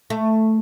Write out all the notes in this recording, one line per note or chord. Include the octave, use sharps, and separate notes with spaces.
A3